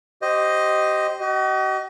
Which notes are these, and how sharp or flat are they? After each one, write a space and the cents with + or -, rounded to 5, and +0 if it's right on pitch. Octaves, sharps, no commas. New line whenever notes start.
G4 -25 C5 +0 D#5 +0
F#4 +45 D#5 +0